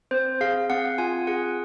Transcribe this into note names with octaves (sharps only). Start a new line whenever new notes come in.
C4 C5
G#4 F5
C4 F#5
F4 G#5
G#4 F#5